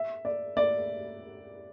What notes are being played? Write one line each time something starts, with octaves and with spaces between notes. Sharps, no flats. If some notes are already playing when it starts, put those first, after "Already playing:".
Already playing: E5
D5
D5